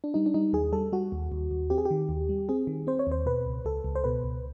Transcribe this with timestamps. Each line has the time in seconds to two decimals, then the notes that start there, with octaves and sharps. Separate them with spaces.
0.04 D4
0.14 G3 D#4
0.26 D4
0.34 G3 D#4
0.53 D#2 G#4
0.72 G3 A4
0.92 G3 F#4
1.12 D#2
1.32 D#2
1.51 D#2
1.70 C4 G4
1.78 G#4
1.85 G4
1.91 D#3
2.09 D#2
2.29 G3
2.49 C4 G#4
2.67 D#3
2.87 C4 C5
2.99 C#5
3.07 D#2 C5
3.26 B2 B4
3.46 C#2
3.65 C#2 A4
3.84 C#2
3.95 C5
4.04 B2 B4
4.24 C#2